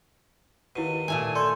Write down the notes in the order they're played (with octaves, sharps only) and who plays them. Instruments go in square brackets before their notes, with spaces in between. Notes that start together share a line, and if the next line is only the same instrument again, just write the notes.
[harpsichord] D#2 B2 [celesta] E4 D#7
[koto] A#2 A3 G#5
[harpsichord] A4 [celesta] D5 C6 G6